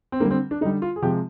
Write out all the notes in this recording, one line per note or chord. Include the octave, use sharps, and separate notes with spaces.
C4
D3 G3 A#3
C4
D4
D3 G3 D#4
F4
G#4
C3 F3 G#3 G4